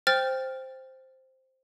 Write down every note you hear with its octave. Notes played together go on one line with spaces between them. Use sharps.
C5 G5 F6 A6